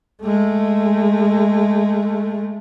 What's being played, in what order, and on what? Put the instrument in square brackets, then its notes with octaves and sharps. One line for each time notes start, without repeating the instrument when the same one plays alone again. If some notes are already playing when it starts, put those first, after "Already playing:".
[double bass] G#3 A3